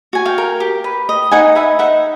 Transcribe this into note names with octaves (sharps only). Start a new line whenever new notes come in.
F#4 G#5
F5 G5
A#4
G4
B4
D#5
D#4 F#5 G#5
B4 E5 F#5
D#4 E5 F#5